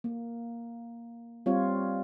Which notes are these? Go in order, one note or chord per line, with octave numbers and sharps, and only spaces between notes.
A#3
G3 C4 F4 C#5